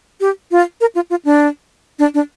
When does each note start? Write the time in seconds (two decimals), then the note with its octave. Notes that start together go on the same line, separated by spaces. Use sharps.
0.20 G4
0.51 F4
0.81 A#4
0.95 F4
1.10 F4
1.25 D4
1.99 D4
2.14 D4